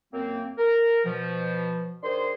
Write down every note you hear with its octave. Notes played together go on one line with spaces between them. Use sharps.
F#2 A#3 C4
A#4
B2 F3
D#3 D4 G#4 C5 C6